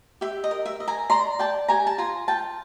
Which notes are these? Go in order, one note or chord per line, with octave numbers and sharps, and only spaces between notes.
G4 E5
D#5
A#4
E5
D#5
G#5 A#5
D5 A#5 C6
D5 G5 A5
G4 G#5 A#5
A5
F4 G#5 A#5
F4 G5 A5